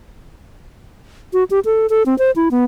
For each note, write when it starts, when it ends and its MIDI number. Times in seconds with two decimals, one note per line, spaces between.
1.33 1.44 66
1.51 1.60 67
1.65 1.86 69
1.90 2.03 69
2.06 2.17 60
2.18 2.31 72
2.36 2.49 64
2.51 2.64 59